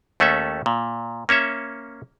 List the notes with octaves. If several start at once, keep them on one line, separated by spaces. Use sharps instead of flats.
D#2 A3 C#4 A4 E5
A#2
A#3 C#4 C#5 E5